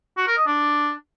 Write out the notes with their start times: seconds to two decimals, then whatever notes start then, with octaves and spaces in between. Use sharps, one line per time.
0.17 F#4
0.27 A#4
0.37 D#5
0.47 D4